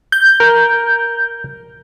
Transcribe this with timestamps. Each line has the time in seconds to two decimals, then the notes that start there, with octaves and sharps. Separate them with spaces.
0.12 G6
0.40 A#4